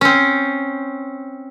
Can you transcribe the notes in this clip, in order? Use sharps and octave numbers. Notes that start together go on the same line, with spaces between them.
C4 C#4